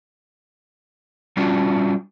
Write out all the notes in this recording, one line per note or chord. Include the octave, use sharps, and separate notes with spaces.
G3 C#4 D4 F4 F#4